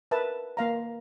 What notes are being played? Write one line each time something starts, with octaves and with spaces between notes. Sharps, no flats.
A#4 B4 E5 A5
A#3 F5 A#5